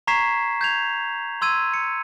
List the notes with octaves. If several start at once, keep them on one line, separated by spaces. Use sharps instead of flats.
A#5 C#6 G#6 B6 C7 E7
G6 G#6 F7
C6 E6 G#6 D#7
C#7